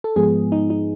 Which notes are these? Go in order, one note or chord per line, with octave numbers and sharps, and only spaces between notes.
A4
G#2 F3 G#3 B3 G#4
D#4
D#4